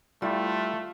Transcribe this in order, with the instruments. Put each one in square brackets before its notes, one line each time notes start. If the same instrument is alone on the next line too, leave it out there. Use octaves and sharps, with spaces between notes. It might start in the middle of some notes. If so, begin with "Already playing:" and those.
[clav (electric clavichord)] G3 E4 G4 [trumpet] A3 [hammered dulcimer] F4